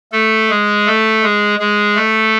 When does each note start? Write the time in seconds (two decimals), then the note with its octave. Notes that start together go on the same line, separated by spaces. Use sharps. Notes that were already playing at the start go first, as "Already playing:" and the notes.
0.12 A3 A4
0.50 G#3 G#4
0.86 A3 A4
1.23 G#3 G#4
1.59 G#3 G#4
1.96 A3 A4